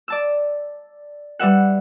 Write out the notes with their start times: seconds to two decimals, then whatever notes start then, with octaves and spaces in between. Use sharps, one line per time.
0.08 D5 A5 E6
1.39 G3 B4 E5 F#5